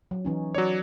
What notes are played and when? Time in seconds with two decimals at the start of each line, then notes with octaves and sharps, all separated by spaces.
0.11 F#3
0.25 E3 C#4 D#4
0.54 F#3 C#5 D5